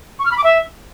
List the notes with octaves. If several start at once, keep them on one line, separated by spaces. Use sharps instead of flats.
C#6
F6
B5
D6
E5